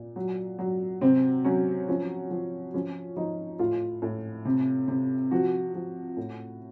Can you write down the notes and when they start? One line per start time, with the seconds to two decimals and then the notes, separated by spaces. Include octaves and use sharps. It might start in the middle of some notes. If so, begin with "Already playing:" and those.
Already playing: A#2
0.16 F#3
0.59 F#3
1.01 C3 C4
1.45 F#3 C#4
1.88 F3 C#4
2.30 F3
2.74 F3 C#4
3.16 F3 D#4
3.59 A2 F4
4.02 A2
4.45 C3
4.88 C3
5.31 F3 F#4
5.75 F3
6.17 A2